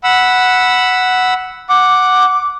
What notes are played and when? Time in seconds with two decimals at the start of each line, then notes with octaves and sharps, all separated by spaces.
0.04 F#5 B5 E6
1.69 F#5 D6